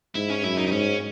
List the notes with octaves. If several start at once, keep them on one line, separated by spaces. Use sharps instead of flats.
G#2 E4
C#4
F#2 E4
D#4
D#4
G#2 C#4